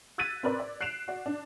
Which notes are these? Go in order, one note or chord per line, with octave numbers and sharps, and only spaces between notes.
E6 F#6 G#6 A6 B6 D#7
C4 A#4 B4 D5
D5
F#6 C7 D7 E7 F7
F#4 D5
D4